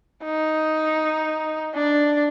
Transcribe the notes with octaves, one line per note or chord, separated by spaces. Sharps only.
D#4
D4